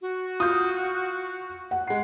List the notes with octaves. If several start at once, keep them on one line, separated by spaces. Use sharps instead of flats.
F#4
F4 D#6 G6
F#5
G#3 C7